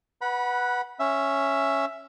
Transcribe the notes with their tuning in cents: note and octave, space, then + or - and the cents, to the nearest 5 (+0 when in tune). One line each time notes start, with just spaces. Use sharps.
B4 -5 F#5 +0 B5 -30
C#4 +0 E5 +5